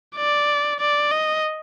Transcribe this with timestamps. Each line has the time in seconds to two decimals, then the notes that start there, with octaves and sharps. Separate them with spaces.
0.16 D5
0.80 D5
1.11 D#5